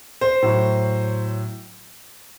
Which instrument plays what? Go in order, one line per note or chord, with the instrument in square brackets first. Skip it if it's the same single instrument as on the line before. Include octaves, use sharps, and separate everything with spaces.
[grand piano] C5
A2 F#3